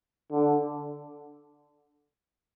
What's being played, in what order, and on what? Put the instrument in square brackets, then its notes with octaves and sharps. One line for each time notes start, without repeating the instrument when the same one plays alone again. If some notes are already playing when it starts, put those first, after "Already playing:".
[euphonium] D3